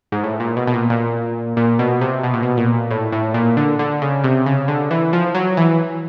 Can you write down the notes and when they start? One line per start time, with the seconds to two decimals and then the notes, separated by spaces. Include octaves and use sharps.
0.12 G#2
0.24 A2
0.40 A#2
0.57 B2
0.67 B2
0.74 A#2
0.90 A#2
1.57 A#2
1.79 B2
2.01 C3
2.23 B2
2.34 A#2
2.43 B2
2.57 A#2
2.91 A2
3.12 A2
3.34 A#2
3.57 D3
3.79 D3
4.02 C#3
4.24 C3
4.46 C#3
4.68 D3
4.91 E3
5.13 F3
5.35 F#3
5.57 E3